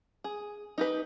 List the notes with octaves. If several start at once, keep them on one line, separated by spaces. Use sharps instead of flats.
G#4
D#4 G4 B4